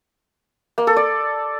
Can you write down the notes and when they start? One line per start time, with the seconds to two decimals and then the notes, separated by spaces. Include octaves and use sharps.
0.78 A#3
0.87 A4
0.96 D5